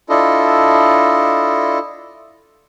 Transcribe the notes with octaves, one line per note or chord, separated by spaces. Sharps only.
D4 E4 F4 A4 D#5